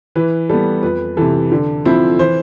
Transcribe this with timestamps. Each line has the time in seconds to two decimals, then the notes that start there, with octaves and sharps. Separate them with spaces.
0.16 E3 B4
0.50 G3 B3 A4
0.83 F2 B4
1.17 C3 E3 A4
1.52 D3
1.85 F3 C4 E4
2.19 E3 C5